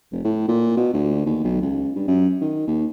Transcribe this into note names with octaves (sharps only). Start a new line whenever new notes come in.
F1
A2
A#2
B2
D2
D#2
B1
C#2
G2
F#2
D#3
D#2